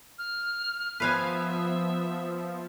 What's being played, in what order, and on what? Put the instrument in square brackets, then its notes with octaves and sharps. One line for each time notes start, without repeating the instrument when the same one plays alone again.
[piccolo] F6
[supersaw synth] F3 [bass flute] B3 [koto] B4 F5 G#5 [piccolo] E5